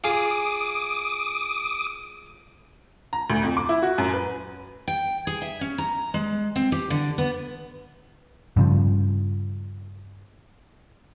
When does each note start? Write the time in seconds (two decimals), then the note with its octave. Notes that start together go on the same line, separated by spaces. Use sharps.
0.04 F4 G#4 D6 D#6
3.13 A#5
3.30 D2
3.43 F2
3.57 D6
3.69 E4
3.83 F#4
3.98 F#2
4.14 B4
4.88 G5
5.27 G#4
5.42 E5
5.61 C#4
5.78 A#5
6.14 G#3
6.56 C4
6.72 G4
6.90 D3
7.18 B3
8.57 G2 C#3 F3